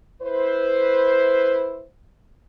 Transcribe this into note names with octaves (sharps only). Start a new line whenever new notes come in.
E4 B4 C5